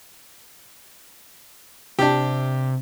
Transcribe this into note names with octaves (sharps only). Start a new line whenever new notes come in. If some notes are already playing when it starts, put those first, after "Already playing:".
C3 D4 G4